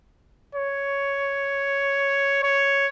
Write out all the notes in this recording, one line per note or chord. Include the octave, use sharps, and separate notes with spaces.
C#5
C#5